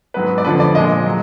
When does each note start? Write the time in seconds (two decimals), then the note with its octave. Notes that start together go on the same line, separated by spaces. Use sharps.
0.14 G#2 F#3 B3 B4
0.38 D5
0.45 F2 D3 F3 B4
0.60 D5
0.75 A#2 F3 G#3 D#5
1.06 F#3